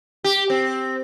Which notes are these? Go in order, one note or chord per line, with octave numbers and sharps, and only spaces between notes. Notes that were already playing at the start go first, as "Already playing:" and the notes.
G4
C4